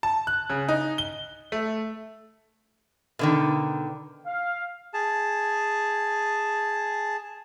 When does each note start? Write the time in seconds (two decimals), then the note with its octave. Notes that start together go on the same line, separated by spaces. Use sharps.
0.03 A5
0.27 F#6
0.50 C#3
0.69 D#4
0.98 G7
1.52 A3
3.19 B2 D3 D#3
4.26 F5
4.94 G#4 A5